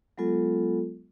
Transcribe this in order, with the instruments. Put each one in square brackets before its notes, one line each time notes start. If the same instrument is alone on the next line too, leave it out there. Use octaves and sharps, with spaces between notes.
[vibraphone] F#3 G#3 B3 F4 A4